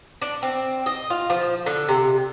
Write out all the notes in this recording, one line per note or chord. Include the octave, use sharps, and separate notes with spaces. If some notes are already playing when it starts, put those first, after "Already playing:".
D4
C4
D#5
F4
F3
D3
C3